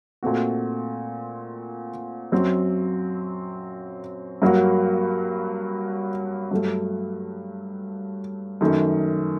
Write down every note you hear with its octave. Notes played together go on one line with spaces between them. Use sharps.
A#2 A3 C4 F#4
F#2 F#3 C4
G2 F#3 A#3 F#4
G2 F#3 A3
F#2 D#3 A3